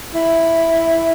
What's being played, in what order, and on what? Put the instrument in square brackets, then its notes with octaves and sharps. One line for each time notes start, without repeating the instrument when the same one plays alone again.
[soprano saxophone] E4